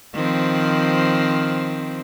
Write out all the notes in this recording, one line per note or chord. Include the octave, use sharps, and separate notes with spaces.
D#3 F3 C4